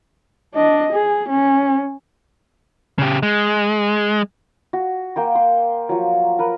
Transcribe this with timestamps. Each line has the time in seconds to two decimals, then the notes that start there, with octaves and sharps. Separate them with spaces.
0.54 D4 D#5
0.92 G#4
1.29 C#4
2.99 C#3 G4
3.23 G#3
4.73 F#4
5.16 A#3 G5 C6
5.35 C6
5.89 F3 F#3
6.39 A#4 B4